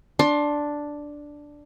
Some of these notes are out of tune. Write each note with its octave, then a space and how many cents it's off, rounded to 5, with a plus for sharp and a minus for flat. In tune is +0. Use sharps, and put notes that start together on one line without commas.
D4 +0 C6 +25